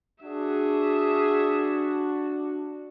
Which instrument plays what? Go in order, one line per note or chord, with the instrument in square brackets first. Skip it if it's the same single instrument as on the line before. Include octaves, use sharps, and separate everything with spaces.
[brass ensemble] D4 F#4 [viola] G#4 E5